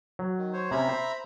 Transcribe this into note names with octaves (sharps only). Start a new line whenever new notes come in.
F#3
D#3
C5 C#5
C3 C#4 E5 A#5 B5
C5